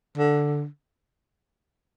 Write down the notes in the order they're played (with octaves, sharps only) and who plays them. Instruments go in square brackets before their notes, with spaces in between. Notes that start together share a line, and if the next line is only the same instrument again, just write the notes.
[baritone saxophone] D3